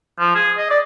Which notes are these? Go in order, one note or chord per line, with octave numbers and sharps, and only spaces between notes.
F3
G#4
D#5
D5